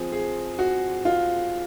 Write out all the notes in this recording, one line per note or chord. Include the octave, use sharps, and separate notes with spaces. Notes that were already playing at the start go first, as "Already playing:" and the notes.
Already playing: F3 C4 G#4
G#4
F#4
F4